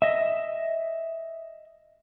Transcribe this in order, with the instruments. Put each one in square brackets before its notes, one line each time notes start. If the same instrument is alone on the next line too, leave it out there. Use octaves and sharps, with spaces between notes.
[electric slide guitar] D#5 E5